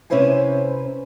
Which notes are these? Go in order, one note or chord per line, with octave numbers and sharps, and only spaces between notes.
C3 C#4 E4 B4 C5 G#5